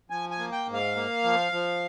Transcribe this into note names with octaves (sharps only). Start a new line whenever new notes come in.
F3 G#5
G#5
A#3
G5
G#2
F5
A#3
F3
F3